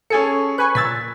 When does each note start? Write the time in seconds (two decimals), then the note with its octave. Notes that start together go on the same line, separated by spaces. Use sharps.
0.10 C#4 G#4 A4 G#5 C#7
0.58 B4 G#5 C#6 F#6
0.75 A#2 E6 G#6 A6 B6